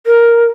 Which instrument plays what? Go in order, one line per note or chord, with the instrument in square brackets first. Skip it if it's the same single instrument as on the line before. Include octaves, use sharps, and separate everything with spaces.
[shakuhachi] A#4